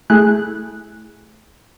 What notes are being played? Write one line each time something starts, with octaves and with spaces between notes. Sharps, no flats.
A3 E4 G#4 F#6